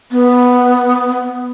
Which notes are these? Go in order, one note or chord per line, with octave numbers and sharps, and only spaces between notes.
B3